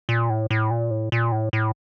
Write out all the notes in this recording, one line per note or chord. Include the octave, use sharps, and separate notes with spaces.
A#2
A2
A2
A#2
A2
A#2
A2
A2